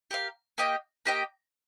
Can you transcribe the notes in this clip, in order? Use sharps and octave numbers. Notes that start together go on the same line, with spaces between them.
G4 A#4 F5
A#3 G4 D#5 G5
A#3 G4 D#5 G5